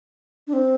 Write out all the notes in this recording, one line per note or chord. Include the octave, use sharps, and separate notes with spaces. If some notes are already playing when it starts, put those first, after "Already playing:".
D4
C4